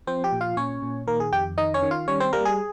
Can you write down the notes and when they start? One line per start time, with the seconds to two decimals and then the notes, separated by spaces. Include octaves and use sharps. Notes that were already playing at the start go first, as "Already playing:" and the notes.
0.07 F3 C4 C5
0.24 G4 G5
0.32 A#2
0.41 F4 F5
0.57 A#2 C#4 C#5
0.82 A#2
1.07 D#3 A#3 A#4
1.20 G#4
1.32 F2 G4 G5
1.58 D#3 D#4 D#5
1.74 C#4 C#5
1.82 D#3
1.91 F4 F5
2.08 G3 C#4 C#5
2.20 C4 C5
2.33 G3 A#3 A#4
2.45 G#4